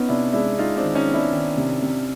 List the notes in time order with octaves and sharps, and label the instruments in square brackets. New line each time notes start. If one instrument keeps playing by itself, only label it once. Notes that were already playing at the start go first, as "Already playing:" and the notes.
Already playing: [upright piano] B3 [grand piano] C#4 D#4
[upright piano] C3 [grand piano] D4 E4
[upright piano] G#3 [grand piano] D4 E4
[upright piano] G#3 [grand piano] D#4 F4
[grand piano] C4 D4
[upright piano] D#3
[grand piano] C#4 D#4
[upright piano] B3
[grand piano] D4 E4
[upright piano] D#3
C3
C3